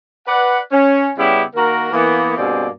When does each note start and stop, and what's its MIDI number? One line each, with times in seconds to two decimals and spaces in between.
0.27 0.58 71
0.27 0.58 74
0.27 0.58 78
0.72 1.09 61
1.17 1.42 49
1.17 1.42 55
1.17 1.42 59
1.17 1.42 61
1.17 1.42 64
1.17 1.42 67
1.55 1.93 51
1.55 1.93 58
1.55 1.93 66
1.55 1.93 70
1.93 2.34 52
1.93 2.34 58
1.93 2.34 59
2.37 2.68 43
2.37 2.68 47
2.37 2.68 58
2.37 2.68 60
2.37 2.68 68
2.37 2.68 74